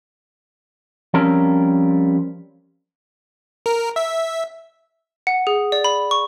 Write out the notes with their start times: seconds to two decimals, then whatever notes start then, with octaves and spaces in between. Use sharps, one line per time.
1.14 F3 G3 C4 C#4 A#4
3.66 A#4
3.96 E5
5.27 F#5
5.47 G#4
5.72 D5
5.84 B5
6.11 C#6